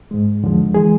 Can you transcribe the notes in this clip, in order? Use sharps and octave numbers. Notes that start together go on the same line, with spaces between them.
G#2 G#3
E2 D3 F3 G#3
E3 G#3 G#4